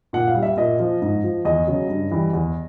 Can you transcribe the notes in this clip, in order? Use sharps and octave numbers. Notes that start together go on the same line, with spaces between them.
A#2 F#5
F5
G3
E5
A#2 D#5
F3
G#2
F3
E2 D#5
C#3 F#3
G2
E3 G3
E2